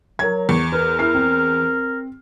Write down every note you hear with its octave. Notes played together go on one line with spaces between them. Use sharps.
F#3 A#4 C#5 G#6
E2 C#6
A#4 B4
E4 A#4 F6 C7
C4